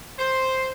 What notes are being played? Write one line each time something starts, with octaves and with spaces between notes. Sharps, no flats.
C5